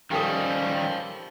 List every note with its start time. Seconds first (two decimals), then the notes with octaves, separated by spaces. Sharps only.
0.11 D#3 G3 C#4 G4 A4 C5 F5 D#6